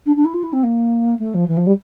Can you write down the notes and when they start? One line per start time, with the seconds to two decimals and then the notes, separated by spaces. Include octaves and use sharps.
0.06 D4
0.16 D4
0.25 E4
0.34 F4
0.43 E4
0.53 C4
0.63 A#3
1.19 A3
1.34 F3
1.48 E3
1.57 F3
1.66 G3